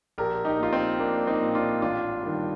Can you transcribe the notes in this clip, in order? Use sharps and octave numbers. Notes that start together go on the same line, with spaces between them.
A#1 G4 A#4
D#4 G4
A#2 F4
C4 D#4
A#1 A#3 D4
C4 D#4
A#2
D4 F4
A1 D4 F4
G2 D#3